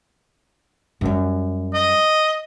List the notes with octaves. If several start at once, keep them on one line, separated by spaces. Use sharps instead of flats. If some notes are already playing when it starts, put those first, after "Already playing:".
F#2 G3
D#5